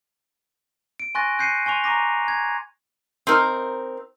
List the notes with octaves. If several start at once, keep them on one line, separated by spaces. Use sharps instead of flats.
D7
G#5 C6 C#6 F#6 A6 A#6
F#6 G6 C7 C#7 D#7
G#5 C6 C#6 F7
A#5 C#6 D6 A#6
G#6
C4 D#4 A#4